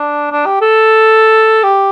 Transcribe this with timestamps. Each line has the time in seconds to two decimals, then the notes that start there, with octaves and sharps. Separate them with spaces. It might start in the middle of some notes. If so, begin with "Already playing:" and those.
Already playing: D4
0.32 D4
0.46 G4
0.62 A4
1.63 G4